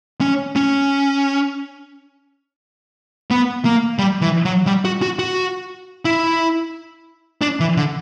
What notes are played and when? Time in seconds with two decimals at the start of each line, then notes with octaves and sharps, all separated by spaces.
0.21 C#4
0.56 C#4
3.31 B3
3.65 A#3
3.99 G3
4.22 E3
4.45 F#3
4.67 G3
4.85 F#4
5.02 F#4
5.19 F#4
6.05 E4
7.42 D4
7.60 E3
7.77 D3